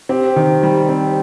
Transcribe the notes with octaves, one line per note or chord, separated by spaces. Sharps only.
C4 G4
D#3
G3
C4